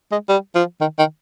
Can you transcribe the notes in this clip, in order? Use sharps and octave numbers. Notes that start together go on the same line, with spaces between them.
G#3
G3
F3
D#3
D#3